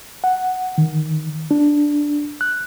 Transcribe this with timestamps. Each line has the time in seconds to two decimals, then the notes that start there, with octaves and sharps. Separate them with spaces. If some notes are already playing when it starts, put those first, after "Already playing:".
0.24 F#5
0.78 D#3
1.51 D4
2.41 F#6